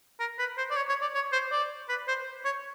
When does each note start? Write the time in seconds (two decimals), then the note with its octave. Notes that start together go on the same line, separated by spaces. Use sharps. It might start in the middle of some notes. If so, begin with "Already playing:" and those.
0.20 A#4
0.39 B4
0.58 C5
0.70 D5
0.76 C#5
0.89 C#5
1.02 D5
1.14 C#5
1.32 C5
1.51 D5
1.89 B4
2.08 C5
2.45 C#5